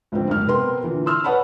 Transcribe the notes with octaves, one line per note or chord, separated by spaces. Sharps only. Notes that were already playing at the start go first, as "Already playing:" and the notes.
C#2 G#2 D3 F3 C4
F#1 G#2 F6
C3 B3 A#4 C6
A#2 D3 E3
C6 E6 F6
B4 C#5 F#5 A5 B5